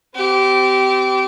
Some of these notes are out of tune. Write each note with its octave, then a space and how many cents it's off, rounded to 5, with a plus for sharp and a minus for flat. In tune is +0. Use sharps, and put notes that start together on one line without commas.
C4 -30 G4 -20